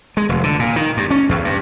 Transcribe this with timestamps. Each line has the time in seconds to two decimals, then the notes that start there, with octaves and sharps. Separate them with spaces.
0.17 G#3
0.29 F1
0.43 D3
0.59 A#2
0.76 D#3
0.97 G2
1.11 C#4
1.29 E2
1.44 G2